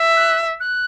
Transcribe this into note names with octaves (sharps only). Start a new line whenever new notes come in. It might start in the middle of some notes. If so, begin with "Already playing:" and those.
Already playing: E5
F#6
F#6